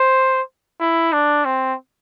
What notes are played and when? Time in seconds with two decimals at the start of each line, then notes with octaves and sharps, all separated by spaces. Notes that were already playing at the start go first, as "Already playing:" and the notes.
Already playing: C5
0.80 E4
1.13 D4
1.45 C4